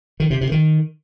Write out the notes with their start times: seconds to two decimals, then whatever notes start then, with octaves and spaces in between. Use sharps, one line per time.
0.20 D#3
0.30 C3
0.41 C3
0.52 D#3